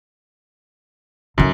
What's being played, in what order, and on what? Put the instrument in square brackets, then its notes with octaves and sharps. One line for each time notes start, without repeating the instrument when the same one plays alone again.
[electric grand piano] F#2 [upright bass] D3 D#3